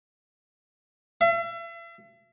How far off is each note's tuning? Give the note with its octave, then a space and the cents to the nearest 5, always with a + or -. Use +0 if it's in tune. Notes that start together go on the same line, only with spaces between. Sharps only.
E5 +40